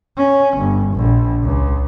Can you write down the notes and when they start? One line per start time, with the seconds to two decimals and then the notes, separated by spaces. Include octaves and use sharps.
0.17 C#4
0.57 G1
0.94 A#1
1.43 C#2